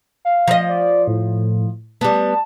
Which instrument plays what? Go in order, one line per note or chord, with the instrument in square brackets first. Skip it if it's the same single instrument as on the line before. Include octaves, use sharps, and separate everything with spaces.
[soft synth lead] F5
[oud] F3 D#5
[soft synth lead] D5
A2
[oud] G3 B3 [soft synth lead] A5